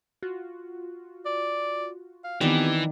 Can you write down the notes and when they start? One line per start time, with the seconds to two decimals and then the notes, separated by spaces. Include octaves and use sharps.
0.23 F4 F#4
1.26 D5
2.24 F5
2.41 D#3 E3 B3 C4 F4 G4 D5